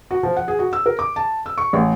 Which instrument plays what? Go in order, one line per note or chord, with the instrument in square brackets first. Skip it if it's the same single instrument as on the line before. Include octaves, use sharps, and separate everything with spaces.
[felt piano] F#4
F3
F#5
G#4
F#4
E6
A#4
D6
A5
E6
C#6
A1